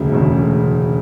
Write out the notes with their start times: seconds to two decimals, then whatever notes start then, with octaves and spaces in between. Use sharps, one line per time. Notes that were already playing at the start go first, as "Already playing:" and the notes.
Already playing: E1 D2 C#3
0.12 E1 D2 C#3